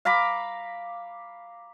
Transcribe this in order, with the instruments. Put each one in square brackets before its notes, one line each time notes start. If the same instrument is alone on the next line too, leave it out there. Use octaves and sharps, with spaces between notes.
[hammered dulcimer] F5 A#5 B5 D6